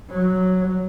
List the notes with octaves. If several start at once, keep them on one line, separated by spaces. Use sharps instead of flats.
F#3